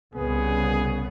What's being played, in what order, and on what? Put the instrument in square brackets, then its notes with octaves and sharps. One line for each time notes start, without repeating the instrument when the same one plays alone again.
[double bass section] C2 C#3 B3 [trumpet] G#4